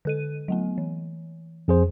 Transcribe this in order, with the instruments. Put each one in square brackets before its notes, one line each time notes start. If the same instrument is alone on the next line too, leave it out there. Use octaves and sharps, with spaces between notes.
[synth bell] D3 A4 D#7
F#3 A3 B3
E3
[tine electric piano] F2 G#4 C5